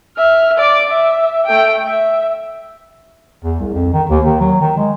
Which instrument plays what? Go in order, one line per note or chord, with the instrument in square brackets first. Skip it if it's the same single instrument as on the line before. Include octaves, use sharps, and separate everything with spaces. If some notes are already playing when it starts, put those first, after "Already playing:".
[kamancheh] E5 F6
D5 D6
E5
A3 G5
E5
[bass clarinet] E2
C2
F2
D#3
D#2
D#3
F#3
D#3
G#3